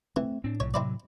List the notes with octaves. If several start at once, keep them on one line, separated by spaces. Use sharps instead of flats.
E3 A3 C4
A2 C4 D4
B1 A#2 C#3 C#5
C3 F#3 C4 E4 D5